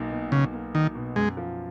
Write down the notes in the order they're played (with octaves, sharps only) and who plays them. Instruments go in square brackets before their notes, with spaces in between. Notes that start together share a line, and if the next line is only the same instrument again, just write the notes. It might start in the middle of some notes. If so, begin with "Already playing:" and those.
Already playing: [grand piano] B1 A#3 D#4
B2
[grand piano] B1 [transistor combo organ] C#3
[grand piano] A#3
[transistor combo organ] D#3 [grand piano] D#4
[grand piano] B2
[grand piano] F#2 [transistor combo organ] G#3
[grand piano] F3